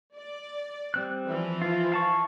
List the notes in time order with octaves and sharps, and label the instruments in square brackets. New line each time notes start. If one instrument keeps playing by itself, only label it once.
[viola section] D5
[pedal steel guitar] G3 C4 F#6
[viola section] E3 F3
[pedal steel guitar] F4
F5 A5 C#6